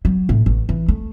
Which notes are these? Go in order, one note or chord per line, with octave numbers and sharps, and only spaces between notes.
F#3
A2
A1
E3
A3